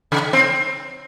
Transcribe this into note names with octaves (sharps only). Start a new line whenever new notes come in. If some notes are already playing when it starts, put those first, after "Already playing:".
C#3
C4